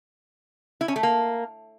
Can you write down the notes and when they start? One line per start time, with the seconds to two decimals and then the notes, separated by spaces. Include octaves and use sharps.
0.81 E4
0.88 C#4
0.96 A3
1.03 A#3